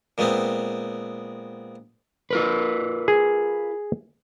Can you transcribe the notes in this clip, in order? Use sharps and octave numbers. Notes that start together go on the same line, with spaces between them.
A#2 G#3 B3 C4
F4 A#4 B4
G#4